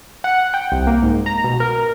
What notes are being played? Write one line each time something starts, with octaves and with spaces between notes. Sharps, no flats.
F#5
G5
C2
A#3
G#2
A#5
B2
A#4